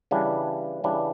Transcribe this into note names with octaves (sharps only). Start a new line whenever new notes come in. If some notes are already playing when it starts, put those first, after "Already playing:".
C#3 E3 G3 D4
C#3 E3 G3 D4